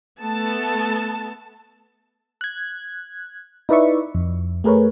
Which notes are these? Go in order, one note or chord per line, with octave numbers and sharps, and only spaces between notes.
A3 B3 A5
F#6 G#6
D#4 E4 B4 D5 E5 C#6
F2
A3 G#4 A#4 B4 C#5